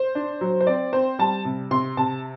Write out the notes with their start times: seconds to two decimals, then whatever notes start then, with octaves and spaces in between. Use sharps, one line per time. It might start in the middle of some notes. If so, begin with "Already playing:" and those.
Already playing: C5
0.15 D4
0.41 F#3
0.61 C5
0.67 C4 D5
0.93 C4 C5
1.19 G3 A5
1.45 C3
1.71 C3 C6
1.97 C3 A5